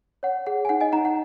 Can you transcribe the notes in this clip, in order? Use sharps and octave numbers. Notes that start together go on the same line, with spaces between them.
C#5 F#5
G#4 F#5
G#5
D#4 F#5
D#5 G#5
D#4 F#5 A#5
F#5